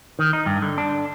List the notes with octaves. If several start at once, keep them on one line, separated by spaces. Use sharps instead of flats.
D#3
D#4
G2
D3
D4